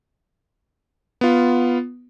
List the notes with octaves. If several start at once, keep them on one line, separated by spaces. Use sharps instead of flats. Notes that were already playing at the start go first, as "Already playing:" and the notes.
B3 F4